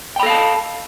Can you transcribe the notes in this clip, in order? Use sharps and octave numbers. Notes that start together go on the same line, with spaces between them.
A4 F5 G5 A5 B5